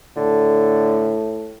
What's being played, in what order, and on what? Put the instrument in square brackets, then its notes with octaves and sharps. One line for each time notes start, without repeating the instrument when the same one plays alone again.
[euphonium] A2 [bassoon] D3